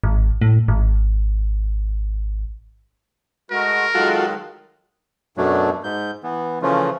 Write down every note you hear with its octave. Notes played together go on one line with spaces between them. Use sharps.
G#1
A2
G#1
G#3 A3 F#4 A#4
D#3 F#3 G#3 F4 F#4 A4
F#2 B2 F#3 A3 D4
G#2 G6
E3 B3
C#3 E3 F3 A3 C#4 F4